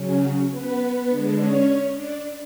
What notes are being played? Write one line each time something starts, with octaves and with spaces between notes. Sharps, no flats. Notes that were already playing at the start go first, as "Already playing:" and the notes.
Already playing: C#3 F#3 C#4
B3 B4
D3 G#3 D4
C#4 C#5
D4 D5